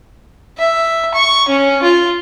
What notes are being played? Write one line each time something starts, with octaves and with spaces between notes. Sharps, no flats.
E5
C#6
C#4
F4